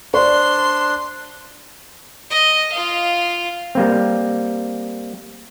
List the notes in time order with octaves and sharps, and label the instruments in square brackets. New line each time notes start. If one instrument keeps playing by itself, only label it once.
[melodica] D4 [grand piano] C5 D5 C#6 [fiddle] C6
[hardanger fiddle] D#5
F4 F5
[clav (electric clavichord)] G3 A#3 C4